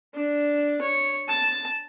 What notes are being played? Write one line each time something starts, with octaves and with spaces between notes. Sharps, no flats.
D4
C#5
A5